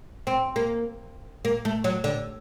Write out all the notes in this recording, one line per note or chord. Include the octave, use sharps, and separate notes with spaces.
C4
A#3
A#3
A3
F#3
D3